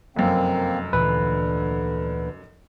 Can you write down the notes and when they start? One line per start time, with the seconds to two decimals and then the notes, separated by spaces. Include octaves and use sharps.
0.16 F1 F#2 A#3 C4
0.93 D2 A#2 D3 E3 B4